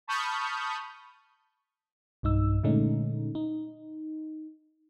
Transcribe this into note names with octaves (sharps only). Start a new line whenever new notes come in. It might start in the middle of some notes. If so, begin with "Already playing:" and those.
A5 B5 C#6 D#6 F6 G6
B1 G2 D#4 E6
A#2 D3 G#3 A3 C#4 D#4
D#4